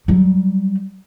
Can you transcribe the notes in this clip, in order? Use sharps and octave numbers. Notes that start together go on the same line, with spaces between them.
F#3 G3